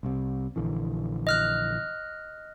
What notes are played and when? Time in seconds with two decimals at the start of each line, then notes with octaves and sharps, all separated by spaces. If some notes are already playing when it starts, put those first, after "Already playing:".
0.03 C2 C3
0.56 A#1 D3 E3
1.27 D#5 F6 F#6